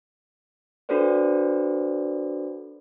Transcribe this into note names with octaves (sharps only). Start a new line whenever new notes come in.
D4 F#4 A4 B4 C5 D5